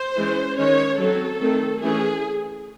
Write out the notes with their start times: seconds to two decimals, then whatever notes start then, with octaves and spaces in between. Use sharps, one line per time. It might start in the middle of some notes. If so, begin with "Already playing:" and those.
Already playing: C5
0.17 E3 G#3 C#4
0.58 D#3 G#3 C#4 C#5
0.99 F#3 C4 A4
1.41 D#3 A3 C4
1.82 E3 A3 C#4 G#4